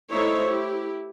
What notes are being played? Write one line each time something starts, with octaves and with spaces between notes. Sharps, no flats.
A3 D#4 E4 C5 C#5 E5
E4 G4